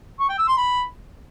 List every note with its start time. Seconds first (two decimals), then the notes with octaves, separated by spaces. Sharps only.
0.20 C#6
0.29 G5
0.39 E6
0.48 C6
0.58 B5